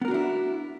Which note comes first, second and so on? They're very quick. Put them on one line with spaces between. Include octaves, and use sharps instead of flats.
B3 A#4 F#4 D4 E4